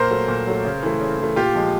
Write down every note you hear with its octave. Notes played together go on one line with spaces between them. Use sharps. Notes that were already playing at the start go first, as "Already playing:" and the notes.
Already playing: A#2 A#4 C5
F#3 A3
A#2
F#3 A3
C#3
E3 A3
C#3
E3 A3
A#2 F4 G4
F3 G#3